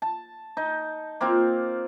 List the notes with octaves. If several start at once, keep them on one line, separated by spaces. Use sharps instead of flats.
A5
D#4
A#3 C4 F4